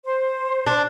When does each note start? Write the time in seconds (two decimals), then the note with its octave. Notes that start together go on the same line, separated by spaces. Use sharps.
0.05 C5
0.67 D4